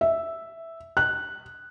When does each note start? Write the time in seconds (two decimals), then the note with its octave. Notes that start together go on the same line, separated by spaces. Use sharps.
0.01 E5
0.97 F#6